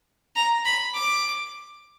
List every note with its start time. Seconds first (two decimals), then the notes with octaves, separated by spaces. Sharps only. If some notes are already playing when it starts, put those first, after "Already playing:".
0.36 A#5
0.65 B5
0.95 D6